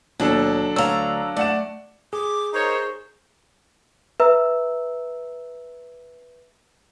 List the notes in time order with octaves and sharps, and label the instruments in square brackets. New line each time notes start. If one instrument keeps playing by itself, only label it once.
[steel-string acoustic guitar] D#2 [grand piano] B2 [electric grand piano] F#3 D4 A4
[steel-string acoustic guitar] D2 A#5 [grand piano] C#5 [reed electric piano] F5 E6
[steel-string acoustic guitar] A3 [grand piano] D5 F#5 E7
[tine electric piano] G#4 [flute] D6
[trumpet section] D#4 A#4 C#5 [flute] C5
[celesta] B4 E5 A#5 E6